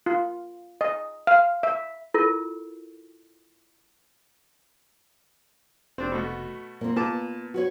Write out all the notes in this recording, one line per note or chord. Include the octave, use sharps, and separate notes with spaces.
F4
D#5
F5
E5
E4 F4 A4 A#4
F1 C4 D4
B2 A3 F#4
A#2 A#3 C4
A#2 B3 B4 A5 D6
F#4 B4 C#5